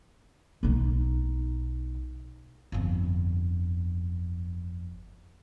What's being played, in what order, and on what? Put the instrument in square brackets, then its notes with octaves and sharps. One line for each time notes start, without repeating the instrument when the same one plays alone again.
[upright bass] B1 D#4
G1 F2